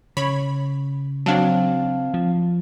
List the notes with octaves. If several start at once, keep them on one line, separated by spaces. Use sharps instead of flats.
C#3 C#5 B5
F#3 C4 D4 F5 A5
F3